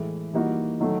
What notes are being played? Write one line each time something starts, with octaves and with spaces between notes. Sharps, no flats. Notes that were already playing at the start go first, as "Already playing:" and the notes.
Already playing: A2 E3 G#3
E3 G3 A#3 D#4 F#4
D#3 F#3 A3